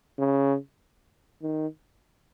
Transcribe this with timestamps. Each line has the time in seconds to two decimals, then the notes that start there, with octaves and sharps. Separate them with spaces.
0.19 C#3
1.42 D#3